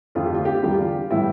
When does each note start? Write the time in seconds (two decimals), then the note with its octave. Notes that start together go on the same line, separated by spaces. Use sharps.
0.15 F2 D3 A3 F4
0.26 G4
0.35 F4
0.45 G4
0.55 F4
0.63 E2 D3 G3 G4
0.74 F4
1.10 A2 E3 G3 E4